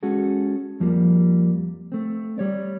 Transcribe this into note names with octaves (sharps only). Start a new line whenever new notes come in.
G#3 C#4 F#4 G#4 A4
F2 F3 G3 A#3
A3 C4
G3 C#5 D5